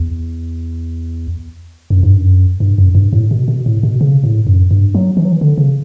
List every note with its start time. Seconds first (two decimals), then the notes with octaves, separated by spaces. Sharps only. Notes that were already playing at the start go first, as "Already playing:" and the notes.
Already playing: E2
1.90 F#2
2.03 G2
2.15 F#2
2.60 G2
2.78 F#2
2.95 G2
3.13 A2
3.31 B2
3.48 B2
3.66 A2
3.83 B2
4.01 C#3
4.24 A2
4.47 F#2
4.71 G2
4.95 F#3
5.17 E3
5.25 F#3
5.32 E3
5.41 D3
5.58 C#3